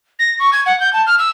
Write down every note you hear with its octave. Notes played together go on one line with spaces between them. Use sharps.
A#6
C#6
G#6
F#5
G6
A5
F6
E6